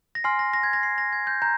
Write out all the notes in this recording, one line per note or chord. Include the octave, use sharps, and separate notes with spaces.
A#6
G#5 C6 F6 C7
A#6
A#6
G#6
A#6
C7
A#6
G#6
G6
A#5 G6